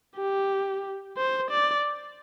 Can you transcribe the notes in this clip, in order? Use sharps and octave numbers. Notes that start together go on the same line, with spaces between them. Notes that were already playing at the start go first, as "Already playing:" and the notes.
G4
C5
D5